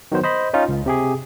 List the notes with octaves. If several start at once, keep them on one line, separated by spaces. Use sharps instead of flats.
D#3 F#3 B3 C5
C5 D#5 B5
C#4 D#4 F4
C#2
C3 G4 G#4